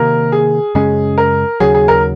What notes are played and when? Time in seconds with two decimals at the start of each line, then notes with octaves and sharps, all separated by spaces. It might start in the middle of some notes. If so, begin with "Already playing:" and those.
Already playing: C3 D#3 A#3 A#4
0.32 G#4
0.75 F#2 C#3 G#3 C#4 G#4
1.18 A#4
1.60 D#2 C#3 F#3 G#4
1.75 G#4
1.88 A#4